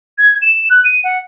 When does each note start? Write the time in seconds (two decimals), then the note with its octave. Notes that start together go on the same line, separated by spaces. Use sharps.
0.18 G#6
0.42 E7
0.70 F#6
0.84 D#7
1.04 F#5